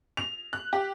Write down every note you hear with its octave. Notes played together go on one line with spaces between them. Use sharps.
F7
F#6
G4